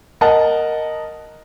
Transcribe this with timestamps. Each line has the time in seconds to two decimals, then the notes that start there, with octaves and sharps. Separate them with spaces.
0.21 A#4 D#5 F#5 A5